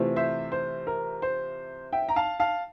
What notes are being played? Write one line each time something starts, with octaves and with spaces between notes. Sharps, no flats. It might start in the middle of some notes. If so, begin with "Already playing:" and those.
Already playing: C3 E3 A3 C4 F4
C5 E5
C5
A#4
C5
E5 G5
A#5
F5 A5
F5 A5